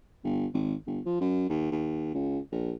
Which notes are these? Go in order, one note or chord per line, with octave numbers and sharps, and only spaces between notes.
G1
G#1
G1
F3
F#2
D#2
D#2
C#2
A#1